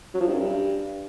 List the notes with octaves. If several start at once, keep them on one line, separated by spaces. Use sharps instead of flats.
F#3
F3
G2
F#2
G2